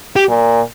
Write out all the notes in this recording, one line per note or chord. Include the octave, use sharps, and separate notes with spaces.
G4
A#2